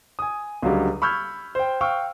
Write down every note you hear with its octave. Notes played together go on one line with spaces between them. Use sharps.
G#5 D#6
C#2 D3 F#3 G3
B5 C#6 E6 F6 G6 G#6
C5 G5
F5 G5 C#6 E6 F6